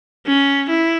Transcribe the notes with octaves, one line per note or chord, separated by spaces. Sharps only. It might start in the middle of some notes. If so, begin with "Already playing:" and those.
C#4
E4